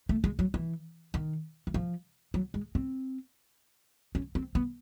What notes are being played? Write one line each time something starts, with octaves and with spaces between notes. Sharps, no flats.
A3
G#3
F#3
E3
D#3
E3
F3
F#3
G#3
C4
C#4
C4
B3